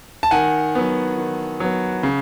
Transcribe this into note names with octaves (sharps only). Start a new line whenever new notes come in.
A5
D#3 F#5 G#5
F#3 B3
D#3
F#3 B3
C#3